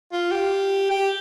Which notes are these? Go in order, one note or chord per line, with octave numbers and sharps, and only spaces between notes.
F4
G4
G4